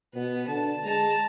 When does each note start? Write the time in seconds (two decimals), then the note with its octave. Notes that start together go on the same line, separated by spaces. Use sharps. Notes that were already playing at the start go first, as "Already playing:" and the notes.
0.14 B2 B3
0.48 D3 A5
0.84 G#3 A5 A#5